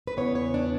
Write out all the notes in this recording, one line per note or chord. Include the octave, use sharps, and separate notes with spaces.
B4
E2 C#3 E3 B3 C#5
C#5
D4